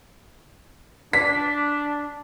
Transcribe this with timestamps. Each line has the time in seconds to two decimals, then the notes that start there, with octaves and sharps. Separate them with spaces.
1.13 D4 B6